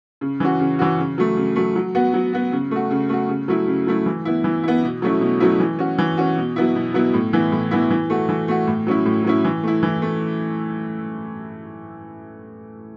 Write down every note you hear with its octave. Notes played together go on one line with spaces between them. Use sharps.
C#3
E3 C#4 F#4
C#3
E3 C#4 F#4
C#3
F#3 A3
C#3
F#3 A3
F#3
B3 F#4
F#3
B3 F#4
C#3
A3 F#4
C#3
A3 F#4
C#3
F#3 A3 E4
C#3
F#3 A3 E4
E3
B3 E4
E3
B3 E4
B2
F#3 A3 C#4 E4
B2
F#3 A3 C#4 E4
E3
C#4 F#4
E3
C#4 F#4
B2
F#3 B3 E4
B2
F#3 B3 E4
A2
E3 B3 E4
A2
E3 B3 E4
E3
A3 F#4
E3
A3 F#4
A2
F#3 C#4 E4
A2
F#3 C#4 E4
E3
A3 E4
E3
A3